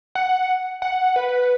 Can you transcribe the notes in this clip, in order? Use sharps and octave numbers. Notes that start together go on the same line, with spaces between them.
F#5
F#5
B4